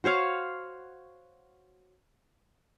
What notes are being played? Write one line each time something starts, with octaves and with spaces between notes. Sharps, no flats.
F#4 C5 C#5 F5